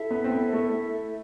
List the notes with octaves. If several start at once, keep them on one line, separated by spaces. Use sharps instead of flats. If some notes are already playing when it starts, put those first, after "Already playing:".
Already playing: E4 A4 E5
B3
C4
B3
A3